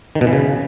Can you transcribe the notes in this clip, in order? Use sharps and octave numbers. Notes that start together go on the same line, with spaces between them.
D#3
B2
E3
C#3